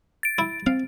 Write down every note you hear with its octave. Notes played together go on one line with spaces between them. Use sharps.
A6 D7
E4
C4 F5